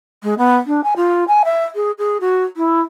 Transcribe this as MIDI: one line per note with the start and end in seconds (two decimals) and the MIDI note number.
0.23 0.34 56
0.38 0.56 59
0.67 0.84 62
0.84 0.94 80
0.96 1.24 65
1.28 1.43 80
1.45 1.65 76
1.75 1.91 68
1.98 2.18 68
2.21 2.44 66
2.57 2.81 64